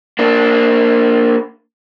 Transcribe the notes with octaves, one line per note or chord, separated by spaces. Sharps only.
A#3 D4